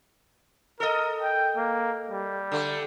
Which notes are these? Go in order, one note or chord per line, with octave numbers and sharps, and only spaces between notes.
A4 A#4 D#5
G5
A#3
G3
D3 A3